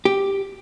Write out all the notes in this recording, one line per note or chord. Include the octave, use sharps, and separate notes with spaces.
G4